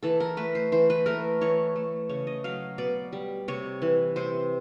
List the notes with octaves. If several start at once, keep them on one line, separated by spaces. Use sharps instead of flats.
E3 A4
A#4
A3 B4
C5
E3 C5
B4
A3 A#4
E3 C#5
A3
C#3 C#5
D#5
F#3 F5
B2 D5
G3
C3 C#5
E3
C3 C5